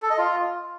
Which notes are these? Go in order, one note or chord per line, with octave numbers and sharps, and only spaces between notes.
A4
D#5
F4